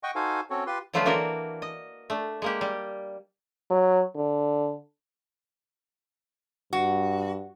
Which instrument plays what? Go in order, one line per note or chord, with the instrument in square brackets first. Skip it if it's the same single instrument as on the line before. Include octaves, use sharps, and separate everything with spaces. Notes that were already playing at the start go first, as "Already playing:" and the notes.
[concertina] D#5 F#5 G5 C#6
D#4 F#4 A4 C5 F5 G#5
C4 C#4 F#4 A4 C#5
F4 G4 B4 C6
[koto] D3 F3 F#3 A3 F4 B4
E3 A#3 D4 F#4 A#4
D#5
A3 D4
G#3 A#3 G4
G3
[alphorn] F#3
D3
[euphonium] G2 [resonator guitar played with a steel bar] F#4